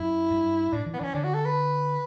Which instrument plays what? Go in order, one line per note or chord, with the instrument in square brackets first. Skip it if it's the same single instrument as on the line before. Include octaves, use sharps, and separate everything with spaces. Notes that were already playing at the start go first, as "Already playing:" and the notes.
Already playing: [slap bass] F#2 [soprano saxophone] E4
[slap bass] G2
[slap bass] A2 [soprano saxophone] D4
[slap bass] E3
[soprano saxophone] B3
[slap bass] E3 [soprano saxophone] C#4 D4
[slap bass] D3 [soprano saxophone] D4
[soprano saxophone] F#4
A4
B4